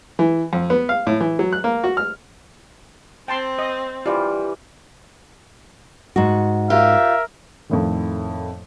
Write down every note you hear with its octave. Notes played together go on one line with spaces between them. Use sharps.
E3
F2
B3
F5
A2
E3
F#3
F#6
A#3
F#4
F6
C4 G5 A5 C6
D#5
E3 G3 F4
G#2 F#4
F4 G4 A#4 E5
F2 A2 D#3